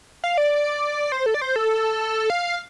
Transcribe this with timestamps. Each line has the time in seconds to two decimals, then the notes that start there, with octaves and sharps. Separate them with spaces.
0.24 F5
0.38 D5
1.12 C5
1.26 A4
1.34 D5
1.42 C5
1.56 A4
2.30 F5